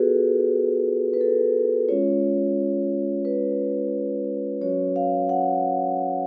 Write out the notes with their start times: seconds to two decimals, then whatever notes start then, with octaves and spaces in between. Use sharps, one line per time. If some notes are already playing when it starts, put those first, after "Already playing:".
Already playing: B3 F4 F#4 G#4 A4 B4
1.13 B4
1.21 A4
1.88 G#3 C#4 F4 C#5
3.25 B4
4.61 F#3 C#4 F#4 C#5
4.96 F5
5.29 F#5